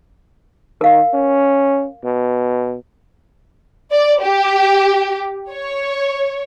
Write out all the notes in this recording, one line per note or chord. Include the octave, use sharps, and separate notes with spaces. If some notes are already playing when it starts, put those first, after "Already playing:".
D#3 A#4 F5
C#4
B2
D5
G4
C#5